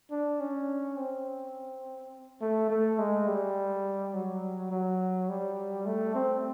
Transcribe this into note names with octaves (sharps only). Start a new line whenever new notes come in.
D4
C#4
C4
A3
A3
G#3
G3
F#3
F#3
G3
A3
C4